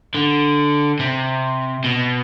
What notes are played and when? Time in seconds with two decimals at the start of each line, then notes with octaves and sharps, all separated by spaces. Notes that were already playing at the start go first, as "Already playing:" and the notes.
0.15 D3
0.99 C3
1.84 B2